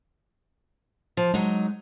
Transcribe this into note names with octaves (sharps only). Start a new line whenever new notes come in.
F3
F#3 G#3 D#4